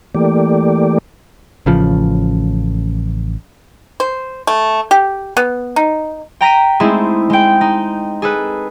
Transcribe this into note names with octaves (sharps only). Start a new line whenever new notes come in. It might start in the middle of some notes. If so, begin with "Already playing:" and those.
E3 A3 A#3 G4 D5
A1 C#3 F3
C5
A3
G4
B3
D#4
G5 A#5 A#6 B6 D#7
G#3 A3 C4 D#4 E4 G#4
G#3 G5
D#4
G#4 A4 B4